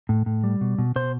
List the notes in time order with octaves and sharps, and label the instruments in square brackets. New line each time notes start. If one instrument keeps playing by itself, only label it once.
[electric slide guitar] A2
A2
G3
B2
B2
B2 C5